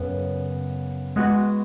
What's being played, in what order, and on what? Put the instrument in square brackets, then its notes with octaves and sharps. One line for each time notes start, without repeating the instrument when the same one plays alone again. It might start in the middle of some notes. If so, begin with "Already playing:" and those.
Already playing: [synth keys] F#2 C#3 B3
G#3 B3 F#4